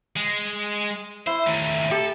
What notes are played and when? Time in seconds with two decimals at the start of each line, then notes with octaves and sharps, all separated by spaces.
0.16 G#3
1.27 E4 C5
1.47 A2 D#3
1.91 G4 A4